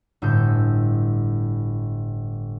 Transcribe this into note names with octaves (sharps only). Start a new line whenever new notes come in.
G1 A2 E6 G6